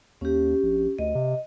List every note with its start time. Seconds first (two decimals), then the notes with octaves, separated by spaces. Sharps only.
0.21 D#2 C#4 G4
0.63 A#1
0.99 D2 D#5
1.15 C3